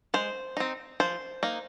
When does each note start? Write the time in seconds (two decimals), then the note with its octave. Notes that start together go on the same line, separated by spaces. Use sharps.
0.14 G#3 C5
0.57 C4 D#4
1.00 F3 C5
1.43 A#3 D#4